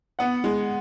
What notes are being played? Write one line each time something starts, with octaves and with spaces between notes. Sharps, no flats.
B3 F#5
G#3